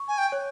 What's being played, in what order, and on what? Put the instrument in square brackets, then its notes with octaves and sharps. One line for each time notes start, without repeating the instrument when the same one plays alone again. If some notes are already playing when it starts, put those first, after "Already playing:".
Already playing: [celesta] C#6
[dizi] G#5
G5
[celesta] C#5